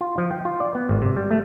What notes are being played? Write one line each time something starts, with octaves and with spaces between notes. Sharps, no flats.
F4
F3
G5
F4
D5
B3
G#1
C3
G3
A3